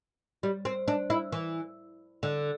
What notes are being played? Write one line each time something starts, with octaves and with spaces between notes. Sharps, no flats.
G3
C4
D4
E4
E3
D3